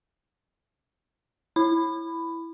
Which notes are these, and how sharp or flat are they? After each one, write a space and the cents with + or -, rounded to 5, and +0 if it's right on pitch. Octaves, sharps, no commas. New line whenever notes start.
E4 +5 B5 +10